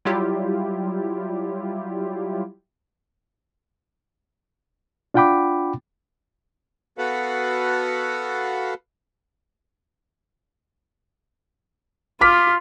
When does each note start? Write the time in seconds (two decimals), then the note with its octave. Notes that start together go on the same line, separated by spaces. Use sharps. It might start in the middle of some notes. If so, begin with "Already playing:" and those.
0.05 F#3 G3 E4 F4 G4
5.14 D4 F4 F#5 G5 B5 D6
6.98 B3 F#4 A4 B4 F5 F#5
12.21 F4 D6 F6 B6